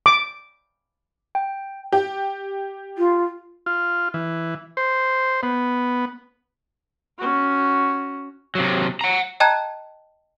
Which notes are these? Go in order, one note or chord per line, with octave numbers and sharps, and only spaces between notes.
D6
G5
G4
F4
F4
E3
C5
B3
C#4 F#4
C3 F#3
F#5 A#5
D#5 G5 A5 A#5 F#6 G#6